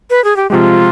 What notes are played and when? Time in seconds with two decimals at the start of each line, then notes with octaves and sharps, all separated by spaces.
0.10 B4
0.24 G#4
0.36 G4
0.50 C3 F3 G#3 F4 G4